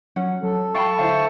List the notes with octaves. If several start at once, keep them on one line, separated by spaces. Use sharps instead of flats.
F#3 C#4 F#5
F#3 A4
F5 G5 A5 B5 C#6
D3 E4 A4 C5 F5